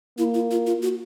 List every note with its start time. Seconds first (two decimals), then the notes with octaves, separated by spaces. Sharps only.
0.18 A#3 E4
0.34 F4
0.51 F4
0.67 F4
0.83 F#4